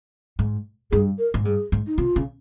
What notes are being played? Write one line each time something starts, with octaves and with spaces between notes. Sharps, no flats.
G#2
G2 G#4
A#4
G#2
G2 G#4
G#2
D#4
C3 F4
C#3